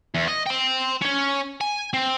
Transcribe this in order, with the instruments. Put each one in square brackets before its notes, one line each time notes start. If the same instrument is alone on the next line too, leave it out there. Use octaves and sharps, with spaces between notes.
[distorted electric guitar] E2
D#5
G5 C6
C#4 C#5
G#5
C4